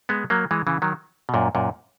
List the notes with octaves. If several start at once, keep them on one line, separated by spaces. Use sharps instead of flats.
G#3 B3
F#3 A#3
E3 G#3
C#3 E3
D#3 F#3
B2
F#2 A#2
F#2 A#2